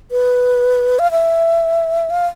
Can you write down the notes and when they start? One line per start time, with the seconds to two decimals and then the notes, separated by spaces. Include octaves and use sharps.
0.11 B4
0.99 F5
1.11 E5
2.10 F5